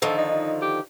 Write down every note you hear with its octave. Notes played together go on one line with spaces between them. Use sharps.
D3 D#3 F3 A4
D#4
G4